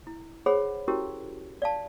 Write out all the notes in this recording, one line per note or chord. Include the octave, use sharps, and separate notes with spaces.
E4
G#4 C5 C#5 F#5 B5
C#4 E4 F#4 G4 A#4
D5 F5 A5